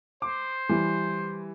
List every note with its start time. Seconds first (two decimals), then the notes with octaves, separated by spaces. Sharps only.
0.22 C5 D6
0.69 E3 G3